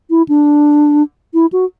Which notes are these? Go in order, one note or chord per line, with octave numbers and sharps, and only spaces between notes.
E4
D4
E4
F#4